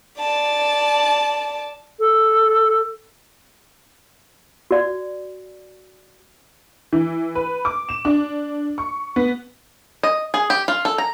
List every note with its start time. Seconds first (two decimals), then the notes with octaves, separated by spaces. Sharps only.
0.20 D5 A5
1.99 A4
4.71 F#4 D5
6.93 E3
7.35 B4
7.65 D6
7.89 E7
8.05 D4
8.78 C#6
9.16 B3
10.03 D#5
10.34 G#4
10.50 G4
10.68 F4
10.85 A4
10.98 A#5